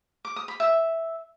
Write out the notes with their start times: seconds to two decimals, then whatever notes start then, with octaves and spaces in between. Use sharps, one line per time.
0.25 D6
0.36 D#6
0.48 B5
0.60 E5